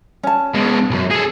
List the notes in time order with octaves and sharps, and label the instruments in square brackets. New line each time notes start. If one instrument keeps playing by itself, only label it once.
[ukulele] C#4 A5
[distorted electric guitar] B2 G#3
B1 F#2
G#4 A4